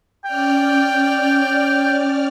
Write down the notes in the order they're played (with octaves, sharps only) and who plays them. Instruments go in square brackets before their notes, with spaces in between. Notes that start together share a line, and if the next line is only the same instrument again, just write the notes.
[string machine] C#4 D5 F6 [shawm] G5